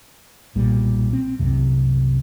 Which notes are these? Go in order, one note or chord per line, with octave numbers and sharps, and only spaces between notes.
B1 A#2 G3
C4
C2 F#2 C3